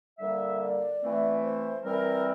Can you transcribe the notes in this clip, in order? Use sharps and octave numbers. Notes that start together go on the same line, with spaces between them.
D3 G3 A#3 E5
D5
E3 A3 C4
C5
E3 G3 C4 A#4